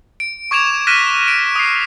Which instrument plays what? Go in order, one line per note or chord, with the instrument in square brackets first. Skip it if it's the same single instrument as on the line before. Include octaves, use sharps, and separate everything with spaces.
[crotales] D7
C#6 D6 G#6 D7 E7 F7
F6 F#6 A#6 B6 D#7 E7
D7
D#6 C7